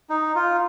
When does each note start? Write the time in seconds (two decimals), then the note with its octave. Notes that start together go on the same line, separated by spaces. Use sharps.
0.10 D#4
0.35 F4